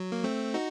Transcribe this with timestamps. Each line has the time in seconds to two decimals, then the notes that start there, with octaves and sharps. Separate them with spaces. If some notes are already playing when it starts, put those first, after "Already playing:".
Already playing: F#3
0.12 A#3
0.24 A3 C4
0.54 D#4 F#4